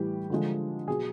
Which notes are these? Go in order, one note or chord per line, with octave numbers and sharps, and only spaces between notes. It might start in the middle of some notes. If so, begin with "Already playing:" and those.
Already playing: A2 E3 G3 G4
D3 F3 G#3
B2 F#3 G#4